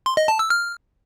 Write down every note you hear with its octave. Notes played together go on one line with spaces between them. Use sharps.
C6
D#5
A5
E6
F6